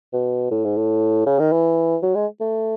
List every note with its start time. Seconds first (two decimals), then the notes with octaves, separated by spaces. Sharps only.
0.13 B2
0.51 A2
0.64 G#2
0.77 A2
1.27 C#3
1.39 D#3
1.52 E3
2.03 F#3
2.15 G#3
2.40 A3